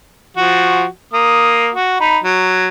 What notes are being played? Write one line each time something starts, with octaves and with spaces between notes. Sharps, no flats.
F3 F#4
A#3 D#6
F#4
D#4 B5
F#3